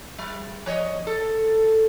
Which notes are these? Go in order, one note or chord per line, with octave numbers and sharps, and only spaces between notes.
G3
F3 C#5 D#5
A4